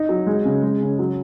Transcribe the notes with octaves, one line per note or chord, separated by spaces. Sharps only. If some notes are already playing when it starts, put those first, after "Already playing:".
Already playing: D#4
F#3
G#3
C#3
G#3
C#3
F#3